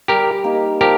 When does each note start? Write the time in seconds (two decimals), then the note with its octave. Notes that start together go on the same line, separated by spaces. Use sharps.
0.08 G3 G4 A#4
0.44 A#3 D#4
0.81 F3 G4 A#4